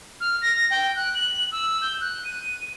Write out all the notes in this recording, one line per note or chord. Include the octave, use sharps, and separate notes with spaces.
F6
A#6
G5
F#6
F#7
E6
G6
F#6
D#7